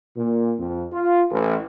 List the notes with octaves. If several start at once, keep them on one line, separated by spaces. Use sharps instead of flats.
A#2
F2
F4
A1